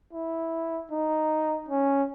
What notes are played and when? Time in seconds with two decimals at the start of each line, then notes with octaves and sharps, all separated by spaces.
0.13 E4
0.91 D#4
1.68 C#4